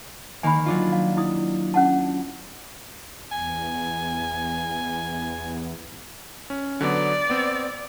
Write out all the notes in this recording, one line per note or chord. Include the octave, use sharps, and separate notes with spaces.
D#3 A#3 G#5 B5
F#3 D4 F4
F5
E4 D#6
C#4 F#5 A5
E2 G#5
C#4
D3 F#3 B3 D5
B3 C4